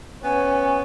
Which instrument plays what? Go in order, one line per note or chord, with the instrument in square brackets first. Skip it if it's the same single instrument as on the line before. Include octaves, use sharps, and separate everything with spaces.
[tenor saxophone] B3 [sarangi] C#4 [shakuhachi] G#5